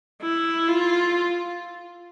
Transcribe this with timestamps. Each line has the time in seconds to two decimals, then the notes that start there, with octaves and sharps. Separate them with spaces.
0.22 E4
0.68 F4